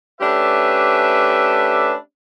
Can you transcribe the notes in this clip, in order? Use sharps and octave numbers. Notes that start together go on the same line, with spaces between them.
A3 C#4 D4 G4 B4 E5